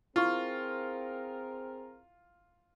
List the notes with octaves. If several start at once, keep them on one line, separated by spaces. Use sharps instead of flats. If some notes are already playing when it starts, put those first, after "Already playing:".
C4 E4 F4 G#4 A#4 C#6